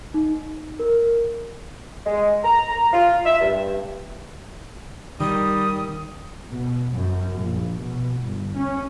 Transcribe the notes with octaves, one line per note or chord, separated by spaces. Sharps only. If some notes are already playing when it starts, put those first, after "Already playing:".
D#4
A#4
G#3
A#5
A#5
F4
E5
G2
D#3 G3 D#6
B2
F#2
A#1
B2
G1
C#4